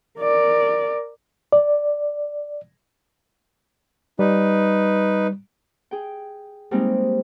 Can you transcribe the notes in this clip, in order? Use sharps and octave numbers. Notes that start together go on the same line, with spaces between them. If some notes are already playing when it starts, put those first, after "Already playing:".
A#4 D5
D5
G3 D#4 B4
G#4 G5
G3 G#3 A#3 C4 D#4